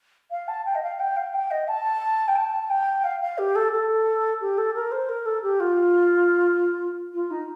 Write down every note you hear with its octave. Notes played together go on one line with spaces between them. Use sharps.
F5
A5
G5
D#5
F5
G5
F5
G5
D#5
A5
G5
A5
G5
F5
F5
G4
A4
A4
G4
A4
A#4
C5
A#4
A4
G4
F4
F4
D#4